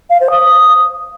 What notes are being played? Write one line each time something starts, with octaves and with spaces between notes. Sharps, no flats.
F5
C5
D#6